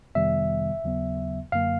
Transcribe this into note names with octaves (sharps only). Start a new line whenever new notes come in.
F2 C3 D#3 G3 B3 E5
D#2 C#3 F#3 B3
F#2 D3 F#3 A#3 F5